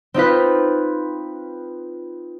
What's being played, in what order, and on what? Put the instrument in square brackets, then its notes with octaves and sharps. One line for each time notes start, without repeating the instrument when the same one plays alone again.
[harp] C4 D#4 F4 B4